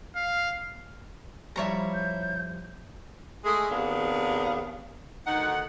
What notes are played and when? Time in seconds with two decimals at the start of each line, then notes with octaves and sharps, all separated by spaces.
0.15 F5
1.56 G2 F3 G3 E4 C#5 A#5
1.94 G6
3.45 G#3 A3 G#4
3.71 D#2 C3 B3 D4 G#4 F5
5.25 D2 D#3 D#4 F#5